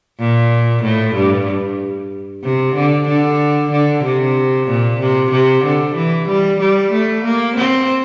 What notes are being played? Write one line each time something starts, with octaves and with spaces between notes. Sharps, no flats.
A#2
A2
G2
C3
D3
D3
D3
C3
A#2
C3
C3
D3
E3
G3
G3
A3
A#3
C4